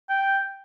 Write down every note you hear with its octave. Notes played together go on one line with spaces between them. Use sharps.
G5